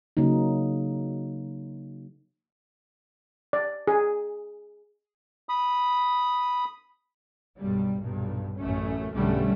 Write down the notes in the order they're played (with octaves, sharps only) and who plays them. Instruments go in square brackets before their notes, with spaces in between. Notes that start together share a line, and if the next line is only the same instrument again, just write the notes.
[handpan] C#3 F#3 A#3 D#4
[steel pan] D5
G#4
[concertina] B5 D#6
[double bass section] B1 G2 G3
B1 G2 A#2
A1 F#2 A3 C#4
B1 G2 D3 G3 A3 C#4